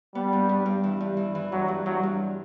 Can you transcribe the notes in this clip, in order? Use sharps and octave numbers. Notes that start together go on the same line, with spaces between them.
G3 B3
G2
G2
G2
E3
G2
E3
E3
G2 F#3
G2
G2 F#3
G2